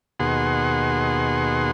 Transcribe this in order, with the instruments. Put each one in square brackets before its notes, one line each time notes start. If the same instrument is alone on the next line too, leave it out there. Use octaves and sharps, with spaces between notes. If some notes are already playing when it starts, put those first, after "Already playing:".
[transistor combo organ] D#2 B2 G#4 F#5 C6